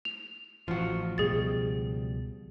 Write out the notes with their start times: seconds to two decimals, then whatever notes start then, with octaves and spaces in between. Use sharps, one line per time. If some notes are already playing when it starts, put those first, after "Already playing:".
0.05 F7
0.68 A1 F3 F#4
1.18 C#2 B2 G3 G#4 A6